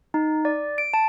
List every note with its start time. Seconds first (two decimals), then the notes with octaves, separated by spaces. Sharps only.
0.14 D#4
0.45 D5
0.78 D7
0.94 A5